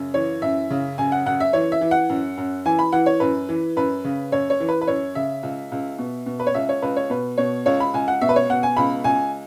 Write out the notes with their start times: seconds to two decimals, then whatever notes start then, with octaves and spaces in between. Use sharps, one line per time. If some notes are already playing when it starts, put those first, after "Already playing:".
Already playing: F#2 C#3
0.14 E3 C#5
0.42 F#2 E5
0.70 C#3
0.98 F#2 G#5
1.12 F#5
1.26 F#2 F#5
1.40 E5
1.53 E3 C#5
1.72 E5
1.81 E3
1.91 F#5
2.09 F#2
2.37 F#2
2.65 E3 G#5
2.79 B5
2.92 E3 F#5
3.06 C#5
3.20 F#2 B4
3.49 E3
3.76 F#2 B4
4.04 C#3
4.32 F#2 C#5
4.50 C#5
4.60 E3
4.68 B4
4.81 B4
4.87 F#2 C#5
5.15 C#3 E5
5.43 C#2
5.72 C#2
5.99 B2
6.26 B2
6.40 B4
6.47 C#5
6.54 C#2 E5
6.69 C#5
6.82 C#2 B4
6.96 C#5
7.10 B2 B4
7.37 B2 C#5
7.66 C#2 C#5
7.80 B5
7.94 C#2 G#5
8.08 F#5
8.21 B2 E5
8.29 B4
8.36 C#5
8.49 B2 F#5
8.63 G#5
8.77 C#2 B5
9.04 C#2 G#5